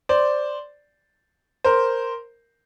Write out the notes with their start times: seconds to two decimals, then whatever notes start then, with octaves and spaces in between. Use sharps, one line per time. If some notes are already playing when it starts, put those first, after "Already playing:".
0.09 C5 D5
1.64 A#4 C5